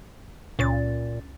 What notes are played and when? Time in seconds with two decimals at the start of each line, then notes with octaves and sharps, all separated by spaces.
0.59 C#2 A#2 C#4 A6